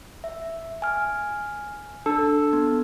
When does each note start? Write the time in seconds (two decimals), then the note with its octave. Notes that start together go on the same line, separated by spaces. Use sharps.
0.24 E5
0.82 G#5 F6
2.06 D4 A4
2.53 B3